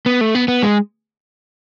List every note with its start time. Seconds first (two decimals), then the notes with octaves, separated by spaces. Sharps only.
0.06 B3
0.21 A3
0.35 B3
0.48 B3
0.63 G#3